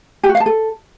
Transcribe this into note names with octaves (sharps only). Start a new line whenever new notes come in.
G4
F#4
F5
A5
A4